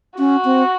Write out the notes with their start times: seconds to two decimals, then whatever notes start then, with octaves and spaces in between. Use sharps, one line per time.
0.18 C#4 F#4
0.45 C4